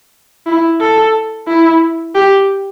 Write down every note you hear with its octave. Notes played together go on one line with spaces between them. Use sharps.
E4
A4
E4
G4